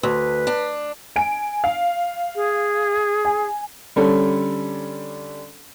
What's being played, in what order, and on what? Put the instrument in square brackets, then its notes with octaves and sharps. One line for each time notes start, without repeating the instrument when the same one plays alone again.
[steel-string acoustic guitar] D2 [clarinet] B4
[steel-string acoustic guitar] D4
[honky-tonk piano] G#5 D7
F5
[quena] G#4
[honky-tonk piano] G#5
[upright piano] D3 G3 C#4 A4